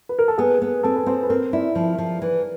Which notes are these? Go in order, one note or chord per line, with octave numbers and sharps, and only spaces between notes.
B4
A#4
A4
B3 G#4
B3
C4 A4
B4
C4 C5
B4
C4 A#4
E4 D5
F3
F3
E3